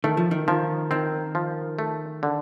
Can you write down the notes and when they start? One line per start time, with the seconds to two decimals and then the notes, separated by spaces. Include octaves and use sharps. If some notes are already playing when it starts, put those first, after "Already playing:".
0.04 D#3 A3
0.17 F3
0.31 D#3
0.48 D#3 F3
0.91 D#3 C4
1.35 F3
1.79 A3
2.23 D3